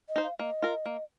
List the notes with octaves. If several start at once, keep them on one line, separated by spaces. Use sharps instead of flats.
D#5
D#4 C5
F5
A#3 D#5
F4 A#4
A#3